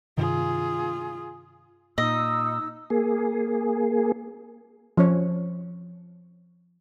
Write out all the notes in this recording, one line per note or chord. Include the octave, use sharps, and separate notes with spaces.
G2 C3 D#3 F4 G#4
A#2 D#4 D#5 E6
A#3 G#4
F3 C#4 C#5